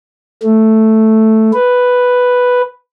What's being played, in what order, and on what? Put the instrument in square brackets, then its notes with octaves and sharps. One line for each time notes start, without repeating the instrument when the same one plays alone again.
[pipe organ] A3
B4